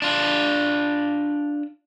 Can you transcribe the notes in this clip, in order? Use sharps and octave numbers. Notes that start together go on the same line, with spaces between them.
D4 F4